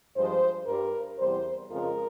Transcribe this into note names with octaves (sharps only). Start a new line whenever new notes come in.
G2 F3 G#3 C5
G2 G3 A#4
E2 C3 G3 C5
F2 C#3 F3 G#3 A#4